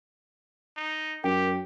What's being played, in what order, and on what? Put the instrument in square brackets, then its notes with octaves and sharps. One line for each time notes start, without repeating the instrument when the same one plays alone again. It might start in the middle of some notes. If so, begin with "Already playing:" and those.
[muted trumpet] D#4
[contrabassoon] F#2 [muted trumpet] G4 [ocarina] A#4 [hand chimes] G5